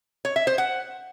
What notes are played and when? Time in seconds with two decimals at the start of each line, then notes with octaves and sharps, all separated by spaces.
0.25 C#5
0.36 E5
0.47 C5
0.58 F#5